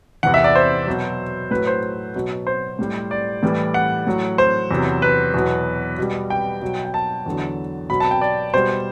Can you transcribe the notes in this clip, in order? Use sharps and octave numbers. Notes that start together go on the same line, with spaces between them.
E2 C3 E3 F#5
E5
D5
C5
B2 F#3
A2 F#3 B4
C5
B2 F#3
C5
A2 G3
D5
A2 E3 G3
F#5
A2 F#3
C5
E2 C3 F#3
B4
E2 B2 F#3
B2 G3
G5
B2 F#3
G5
A5
E2 D3 F#3
B2 F#3 B5
A5
G5
D5
B2 G3 C5